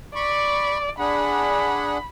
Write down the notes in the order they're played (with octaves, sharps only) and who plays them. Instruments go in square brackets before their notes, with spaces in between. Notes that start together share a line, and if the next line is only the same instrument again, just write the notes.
[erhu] D5 [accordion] B5 C#6
[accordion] D4 G#4 F#5 [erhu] B5